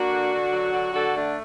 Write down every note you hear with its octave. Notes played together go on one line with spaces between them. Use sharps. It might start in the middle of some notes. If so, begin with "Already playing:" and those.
Already playing: A#3 D4 F#4
D3
D3
F#3
D3
D3 F#4 A4
A3 D4